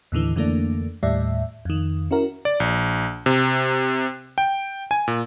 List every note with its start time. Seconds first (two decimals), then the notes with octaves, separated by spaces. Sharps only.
0.12 D#2 A2 D3 E3
0.36 F2 D3 E3 A3 A#3 D4
1.03 D#2 A2 G3 D5 E5
1.65 F2 D#3
2.11 C#4 E4 F#4 A#4
2.45 D5
2.60 A#1
3.26 C3
4.38 G5
4.91 G#5
5.08 A#2